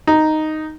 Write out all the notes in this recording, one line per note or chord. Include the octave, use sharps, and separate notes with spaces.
D#4